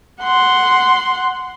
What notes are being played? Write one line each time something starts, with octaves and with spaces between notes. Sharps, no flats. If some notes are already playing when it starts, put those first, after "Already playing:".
F#5 C6